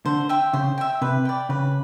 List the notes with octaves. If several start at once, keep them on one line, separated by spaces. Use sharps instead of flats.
D3 C5
E5 G5
C#3 C5
E5 G5
C3 B4
D5 G5
C#3 B4